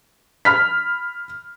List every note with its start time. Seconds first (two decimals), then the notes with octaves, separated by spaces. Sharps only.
0.45 B5 F6 B6